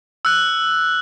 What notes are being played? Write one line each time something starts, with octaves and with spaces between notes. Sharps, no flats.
E6 F#6